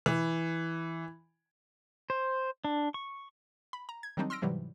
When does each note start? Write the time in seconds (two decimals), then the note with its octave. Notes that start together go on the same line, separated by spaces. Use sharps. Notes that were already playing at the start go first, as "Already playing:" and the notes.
0.06 E3
2.10 C5
2.65 D4
2.94 C#6
3.73 B5
3.89 A#5
4.03 G#6
4.17 D#3 F#3 G3 C4 D4 D#4
4.30 C6 E6 F6 A#6 D7
4.42 G#2 C3 E3 F#3 G3